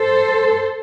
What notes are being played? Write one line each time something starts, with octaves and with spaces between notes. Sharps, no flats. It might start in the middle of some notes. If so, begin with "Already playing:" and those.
Already playing: A4 C5